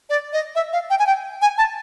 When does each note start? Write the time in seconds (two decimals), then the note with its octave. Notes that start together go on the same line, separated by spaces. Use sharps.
0.09 D5
0.33 D#5
0.55 E5
0.73 F5
0.90 G5
0.99 G#5
1.06 G5
1.42 G#5
1.58 A5